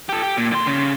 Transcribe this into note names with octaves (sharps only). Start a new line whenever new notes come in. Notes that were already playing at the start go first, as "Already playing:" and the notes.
G4 A4
G4
A#2
D3 C6
C#3